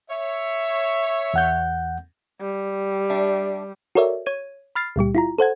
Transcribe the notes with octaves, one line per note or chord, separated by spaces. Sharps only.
C#5 E5
E2 F#5 G6
G3
D4 E5
F#4 A4 A#4 C#5 D5 E5
C#5 G#6 D#7
B5 F6 A6 C7
C#2 A#2 G3 G4
E4 F4 A#5
A4 C5 F#5 G#6